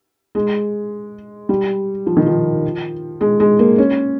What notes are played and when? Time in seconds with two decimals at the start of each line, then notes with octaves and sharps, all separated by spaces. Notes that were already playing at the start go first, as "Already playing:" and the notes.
0.35 G#3
1.49 G3
2.06 F3
2.17 D#3
2.26 F3
3.21 G#3
3.40 G#3
3.59 A#3
3.78 C#4